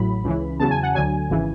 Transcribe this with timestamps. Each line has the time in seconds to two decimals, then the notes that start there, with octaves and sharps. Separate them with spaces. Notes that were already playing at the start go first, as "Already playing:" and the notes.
Already playing: A1 A2 F#3 B5
0.24 C#2 C#3 E3
0.60 E2 C#3 F#3 A5
0.71 G#5
0.83 F#5
0.95 D2 D3 F#3 G#5
1.29 G#1 C#3 E3